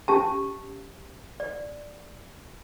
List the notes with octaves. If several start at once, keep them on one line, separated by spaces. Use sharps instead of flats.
C#4 G4 A5
D5